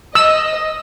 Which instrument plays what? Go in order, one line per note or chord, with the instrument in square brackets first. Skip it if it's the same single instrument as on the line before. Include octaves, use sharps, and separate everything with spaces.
[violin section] D#5 [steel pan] E6